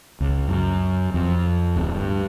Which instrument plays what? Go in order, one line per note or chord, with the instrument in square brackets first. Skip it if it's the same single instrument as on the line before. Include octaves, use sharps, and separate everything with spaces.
[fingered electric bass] C#2
F#2
F2
D1
G2